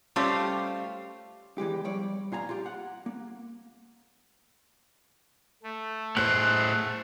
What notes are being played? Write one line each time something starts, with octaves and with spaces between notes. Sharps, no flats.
G3 A3 C#4 F4 G4 C5
E2 E3 G#3 G4
F3 G3 C#5 D5
A#2 F4 G#5 A#5
F4 G4
F#5
A#3
A3
A2 C5 F#6